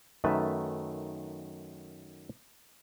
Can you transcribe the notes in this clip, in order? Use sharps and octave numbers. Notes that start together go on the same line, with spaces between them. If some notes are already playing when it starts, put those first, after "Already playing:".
F#2 D#3 A3 B4 E5 A5